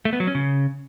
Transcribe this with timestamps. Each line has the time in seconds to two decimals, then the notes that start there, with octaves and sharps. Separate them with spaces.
0.05 A3
0.13 B3
0.20 F#3
0.27 C#4
0.35 C#3